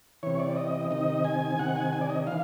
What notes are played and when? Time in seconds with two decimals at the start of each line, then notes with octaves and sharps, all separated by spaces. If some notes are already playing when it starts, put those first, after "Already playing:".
0.23 C3 E3 C#5
0.40 D5
0.57 D#5
0.91 C3 D#3 D#5
1.25 G#5
1.59 C3 D#3 F#5
1.76 G#5
1.93 G#5
2.01 D5
2.10 D#5
2.27 E3 F5